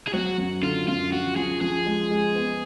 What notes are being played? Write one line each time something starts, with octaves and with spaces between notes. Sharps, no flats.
G#4
F#3 F#4
F#2
D3 F4
F#2 F4
F3 F#4
F3 G#4
F3 G#4
G#3
G#3
B3